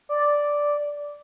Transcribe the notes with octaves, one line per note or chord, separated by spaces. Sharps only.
D5